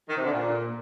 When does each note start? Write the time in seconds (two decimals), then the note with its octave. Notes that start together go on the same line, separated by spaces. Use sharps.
0.09 D#3
0.16 C3
0.24 D3
0.32 A#2